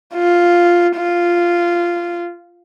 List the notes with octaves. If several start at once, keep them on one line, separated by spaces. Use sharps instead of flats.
F4
F4